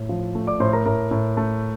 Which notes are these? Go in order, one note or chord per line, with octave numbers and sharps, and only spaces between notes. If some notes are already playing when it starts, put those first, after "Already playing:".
Already playing: A2
F3
A3
D5 D6
A2 C5 C6
A#4 A#5
A2 A#4 A#5
A2
A3